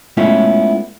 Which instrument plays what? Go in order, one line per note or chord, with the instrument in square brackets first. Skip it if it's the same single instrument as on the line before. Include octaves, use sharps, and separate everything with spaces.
[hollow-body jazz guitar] G#3 A3 B3 C#4 E4 F4